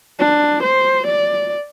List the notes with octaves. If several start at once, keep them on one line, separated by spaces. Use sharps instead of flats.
D4
C5
D5